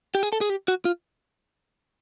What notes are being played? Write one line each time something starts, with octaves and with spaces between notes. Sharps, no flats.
G4
G#4
A4
G#4
G4
F#4
F4